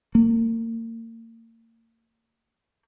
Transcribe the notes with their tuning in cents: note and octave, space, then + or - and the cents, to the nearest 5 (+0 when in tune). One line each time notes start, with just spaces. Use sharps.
A#3 -40